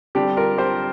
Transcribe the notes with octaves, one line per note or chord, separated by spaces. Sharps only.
D3 G3 C4 D4 G4
F4 A#4
G4 C5